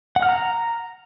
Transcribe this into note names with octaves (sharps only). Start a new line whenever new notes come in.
F#5
F6
A#5